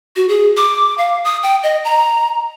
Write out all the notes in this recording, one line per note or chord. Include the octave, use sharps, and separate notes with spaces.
F#4
G#4
D6
F5
D#6
G5
D#5
A#5